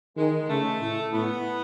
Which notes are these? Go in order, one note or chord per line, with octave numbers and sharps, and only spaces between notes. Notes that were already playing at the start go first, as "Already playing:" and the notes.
D#3 G#3
C#3 A3
A2
A2 B3